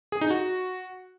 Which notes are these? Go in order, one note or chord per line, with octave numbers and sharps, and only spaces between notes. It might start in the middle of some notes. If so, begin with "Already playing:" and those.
G#4
D#4
F#4